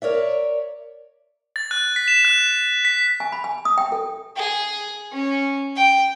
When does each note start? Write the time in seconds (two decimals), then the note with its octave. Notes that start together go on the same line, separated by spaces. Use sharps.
0.02 A#4 C#5 D5 E5
1.56 A6
1.71 F#6
1.96 B6
2.08 E7
2.25 F#6
2.85 B6
3.20 G#5
3.32 B5
3.44 G#5
3.65 D#6
3.78 G5
3.92 A4
4.36 G#4
5.12 C#4
5.76 G5